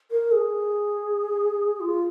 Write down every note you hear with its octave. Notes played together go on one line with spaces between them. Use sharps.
A#4
G#4
F4